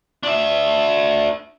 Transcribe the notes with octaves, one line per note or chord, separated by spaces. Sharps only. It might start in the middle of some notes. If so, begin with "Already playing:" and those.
D4 E5